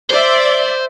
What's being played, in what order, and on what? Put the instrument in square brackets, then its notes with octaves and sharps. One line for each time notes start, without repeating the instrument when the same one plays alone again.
[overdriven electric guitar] C5 [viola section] D5 E5